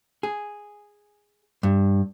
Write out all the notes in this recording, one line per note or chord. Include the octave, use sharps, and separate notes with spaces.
G#4
G2